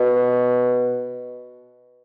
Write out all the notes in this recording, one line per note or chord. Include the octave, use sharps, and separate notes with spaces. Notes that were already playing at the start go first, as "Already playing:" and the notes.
Already playing: B2